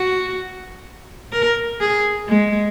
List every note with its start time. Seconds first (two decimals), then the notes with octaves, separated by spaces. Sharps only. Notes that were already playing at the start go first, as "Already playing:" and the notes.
Already playing: F#4
1.32 A#4
1.80 G#4
2.28 G#3